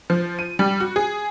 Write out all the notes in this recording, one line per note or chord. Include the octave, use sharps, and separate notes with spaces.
F3
D#7
G3
F#4
G#4